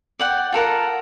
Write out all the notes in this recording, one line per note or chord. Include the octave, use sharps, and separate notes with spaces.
D5 F#5 G5
F4 A4 A#4 F#5